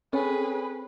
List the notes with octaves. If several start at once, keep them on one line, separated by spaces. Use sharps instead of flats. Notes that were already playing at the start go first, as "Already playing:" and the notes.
C4 C#4 G#4 A4 B4 C#5 G#5